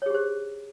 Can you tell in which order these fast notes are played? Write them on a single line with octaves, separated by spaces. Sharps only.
C#5 G#4 G4 C5